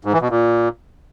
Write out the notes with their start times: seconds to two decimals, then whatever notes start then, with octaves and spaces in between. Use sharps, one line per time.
0.05 G#2
0.13 E3
0.21 B2
0.30 A#2